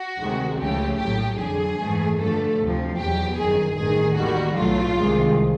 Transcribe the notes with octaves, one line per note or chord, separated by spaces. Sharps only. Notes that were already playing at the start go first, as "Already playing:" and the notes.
Already playing: F#4
D2 C3 D#3 G#3
C#2 C#3 F3 A3 G4
A#1 A2 F#3 G4
F2 D3 F#3 G#4
G#2 E3 A3
G2 D3 F3 A3 A4
D2 C3 F3
E2 B2 F#3 G4
G1 F#2 D#3 G#4
A1 G2 D#3 G#4
D#2 D#3 G3 F#4
B1 A2 F#3 A3 F4
C2 C3 D#3 G#3